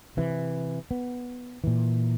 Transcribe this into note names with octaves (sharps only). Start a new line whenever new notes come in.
C3 E3
B3
A#2 E3